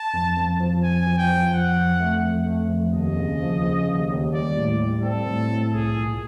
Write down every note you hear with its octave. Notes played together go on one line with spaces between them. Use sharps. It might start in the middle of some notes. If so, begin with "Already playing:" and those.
Already playing: A5
F2
F2
F3
F2 G#5
F3
G5
F3
F2 F#5
F2
A3
F2
A3
F2
D#2 D#5
C#3
F3
C#3
D#2
D#2
G3 D5
A2
G3
C4 A4
A2
A2
C2 G#4
A#2